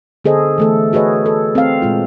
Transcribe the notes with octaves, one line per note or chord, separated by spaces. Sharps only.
D3 B3 G#4 A4 C5 D#5
E3 A3 A4
F#4 G#4 B4 C#5 D#5
A4
C4 F5
A#2 G#3 F4